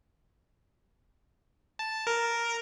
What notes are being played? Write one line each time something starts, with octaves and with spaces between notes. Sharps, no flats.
A5
A#4